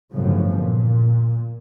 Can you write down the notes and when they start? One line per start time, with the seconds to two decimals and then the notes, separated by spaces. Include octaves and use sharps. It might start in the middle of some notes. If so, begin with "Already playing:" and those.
0.13 G1 F#2 A2 C#3 F3
0.56 A#2